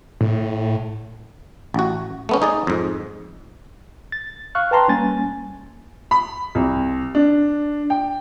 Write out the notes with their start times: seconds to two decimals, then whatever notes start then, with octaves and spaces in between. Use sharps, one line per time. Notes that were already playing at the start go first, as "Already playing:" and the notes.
0.21 A2
1.74 A1 F#4
2.29 A3 B3 C#4
2.42 D#4 G#4 D5
2.67 F2 G#2
4.12 A6
4.55 F5 C#6 F6 F#6
4.71 B4 G5 A5 A#5 C6
4.88 G3 A#3 C#4 G#5 A6
6.11 B5
6.55 C2
7.15 D4
7.90 G5